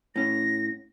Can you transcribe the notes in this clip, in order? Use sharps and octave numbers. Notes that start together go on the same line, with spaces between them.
A2 C#4 A#6